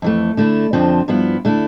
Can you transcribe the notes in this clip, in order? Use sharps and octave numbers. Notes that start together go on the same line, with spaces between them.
F2 E3 A3
D3 A3 E4
F2 D3 F3 C4
G2 F3 B3 E4
D3 A3 E4